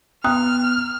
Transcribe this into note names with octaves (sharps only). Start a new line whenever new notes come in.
B3 G5 A#5 D#6 F6 F#6